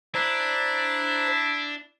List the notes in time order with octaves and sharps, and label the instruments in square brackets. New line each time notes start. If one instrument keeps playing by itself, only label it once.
[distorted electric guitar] D4 [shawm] E4 [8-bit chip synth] C5 A#5 F#6